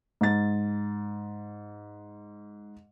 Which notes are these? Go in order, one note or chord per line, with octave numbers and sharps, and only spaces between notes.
G#2 A6